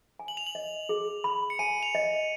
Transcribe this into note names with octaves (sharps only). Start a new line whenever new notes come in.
G#5
F#7
F7
F#7
D#5
G#4
B5
C#7
G#5 D#7
F7
D#5